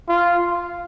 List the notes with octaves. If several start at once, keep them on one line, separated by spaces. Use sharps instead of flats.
F4